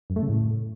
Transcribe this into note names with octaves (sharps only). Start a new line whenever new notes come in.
F#2
A3
C#3
A2